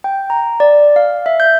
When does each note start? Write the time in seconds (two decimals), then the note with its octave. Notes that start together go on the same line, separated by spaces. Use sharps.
0.04 G5
0.30 A#5
0.60 D5
0.96 F5
1.26 E5
1.40 G6